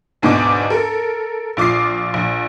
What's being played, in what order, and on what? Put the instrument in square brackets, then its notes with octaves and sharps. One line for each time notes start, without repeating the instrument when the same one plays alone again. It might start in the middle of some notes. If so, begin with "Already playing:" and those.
[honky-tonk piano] D2 G#2 B2 D4 D#4 D6
A4 A#4
A#1 F4 D6 D#6 C7
A#1